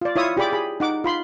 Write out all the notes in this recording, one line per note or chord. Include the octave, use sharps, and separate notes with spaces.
F4 D5
E4 F4 C#5 E5 D#6
F4 G4 G#4 D5 B5 D6
G#4 B5
D#4 F#5 D6
F4 B5 C6